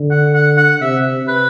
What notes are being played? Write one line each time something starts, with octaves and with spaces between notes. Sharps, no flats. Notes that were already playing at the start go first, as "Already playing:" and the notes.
Already playing: D3
F#5
F#5
F#5
C3 E5
B4